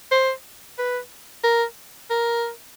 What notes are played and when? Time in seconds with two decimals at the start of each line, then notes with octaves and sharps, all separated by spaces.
0.11 C5
0.79 B4
1.43 A#4
2.10 A#4